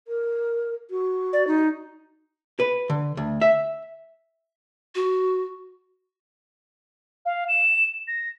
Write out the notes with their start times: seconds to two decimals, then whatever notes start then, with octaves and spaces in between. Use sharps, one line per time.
0.07 A#4
0.90 F#4
1.33 D5
1.47 D#4
2.60 B4
2.90 D3
3.17 D2
3.41 E5
4.95 F#4
7.26 F5
7.48 E7
8.08 A#6